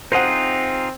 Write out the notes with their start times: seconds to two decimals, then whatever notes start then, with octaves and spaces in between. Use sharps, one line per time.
0.12 C4 D#4 F4 G#4 C5 F#5